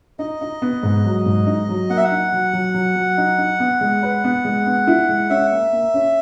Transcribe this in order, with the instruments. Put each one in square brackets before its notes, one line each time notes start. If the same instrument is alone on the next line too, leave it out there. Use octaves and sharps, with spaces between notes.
[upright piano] D#4 [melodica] D#5
[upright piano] D#4
B3
G#2
F#3
G#2
D#4
F#3
[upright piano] A#3 [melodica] F#5
[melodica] E5
F#5
[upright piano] D#4
F#3
F#3
F#3
F#3
D#4
D#4
B3
G#3
B4
B3
G#3
B3
E4
G#3
[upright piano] C#4 [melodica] E5
[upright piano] A#3
A#3
C#4